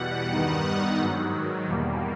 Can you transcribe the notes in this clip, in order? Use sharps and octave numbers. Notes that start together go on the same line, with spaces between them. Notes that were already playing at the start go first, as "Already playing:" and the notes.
Already playing: E2 B2 G3 F#5
G2 D#3 G3 B3 D#4
G#2 D#3 F#3
E2 B2 G3 A#3